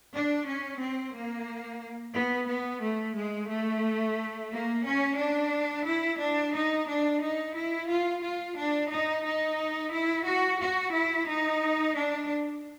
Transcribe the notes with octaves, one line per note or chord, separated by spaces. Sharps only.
D4
C#4
C4
A#3
B3
B3
A3
G#3
A3
A#3
C#4
D4
E4
D4
D#4
D4
D#4
E4
F4
F4
D4
D#4
D#4
E4
F#4
F#4
E4
D#4
D4